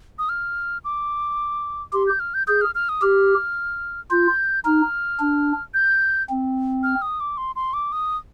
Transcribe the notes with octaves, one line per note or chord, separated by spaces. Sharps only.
D#6
F6
D6
G4 C6
G6
F6
G6
G#4 G6
F6
F6
D#6
G4 F6
F4 G6
D#4 F6
D4
G6
C4
F6
D#6
D6
C6
C6
D6
D#6